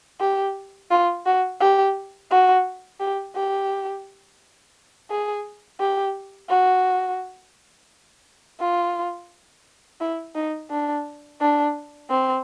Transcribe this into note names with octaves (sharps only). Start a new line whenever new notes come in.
G4
F4
F#4
G4
F#4
G4
G4
G#4
G4
F#4
F4
E4
D#4
D4
D4
C4